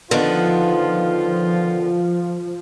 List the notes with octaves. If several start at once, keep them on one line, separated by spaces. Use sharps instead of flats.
D3 D#3 F3 B3 F4